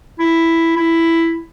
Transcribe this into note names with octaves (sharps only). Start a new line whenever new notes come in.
E4
E4